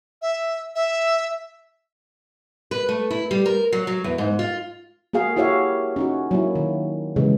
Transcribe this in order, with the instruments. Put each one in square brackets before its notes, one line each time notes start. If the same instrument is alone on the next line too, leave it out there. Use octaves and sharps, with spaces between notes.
[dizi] E5
E5
[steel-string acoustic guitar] B4
A3
E4
G3
A#4
F#3
F#3
E2
G#2
F4
[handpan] A#3 F#4 G#4 F5
E4 F#4 G4 C#5 E5 F5
C#4 D#4 F#4
F#3 A#3 E4
D#3
C#3 E3 G#3